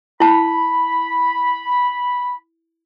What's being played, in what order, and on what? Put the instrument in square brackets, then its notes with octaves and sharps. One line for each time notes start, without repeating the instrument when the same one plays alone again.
[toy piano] E4 A5 [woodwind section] B5